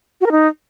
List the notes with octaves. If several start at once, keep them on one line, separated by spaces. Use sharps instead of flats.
F#4
A#4
D#4